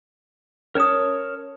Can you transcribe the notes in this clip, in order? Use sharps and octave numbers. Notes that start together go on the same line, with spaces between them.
C#4 A#4 C#5 A5 D#6